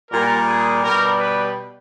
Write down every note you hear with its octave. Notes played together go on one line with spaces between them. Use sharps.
A#2 G3 A#4
G#4
B2 G3 A#4
B4